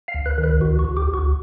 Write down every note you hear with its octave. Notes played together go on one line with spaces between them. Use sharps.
F5
D2
B4
D#3
B4
D2 F#4
F#4
D2
G4
D2
F#4